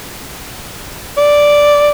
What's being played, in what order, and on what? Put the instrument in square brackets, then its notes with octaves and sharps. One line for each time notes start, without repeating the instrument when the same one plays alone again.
[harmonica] D5